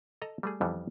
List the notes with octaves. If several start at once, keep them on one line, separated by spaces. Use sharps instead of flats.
A4 D#5 A#5
G3 A3 G#4
F2 D#3 E3 G3 B3